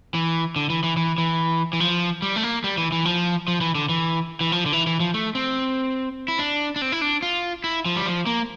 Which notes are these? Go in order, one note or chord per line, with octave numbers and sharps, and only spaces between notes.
E3
D3
E3
E3
E3
E3
E3
F3
G3
A3
A#3
G3
E3
E3
F3
F3
E3
D3
E3
E3
F3
D3
E3
E3
F3
A3
C4
E4
D4
D4
C4
E4
D4
F4
E4
F3
G3
F3
A#3